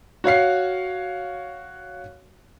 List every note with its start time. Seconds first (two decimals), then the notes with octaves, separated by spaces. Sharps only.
0.24 F#4 C#5 F5 C7